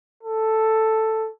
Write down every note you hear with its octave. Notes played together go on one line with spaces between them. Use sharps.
A4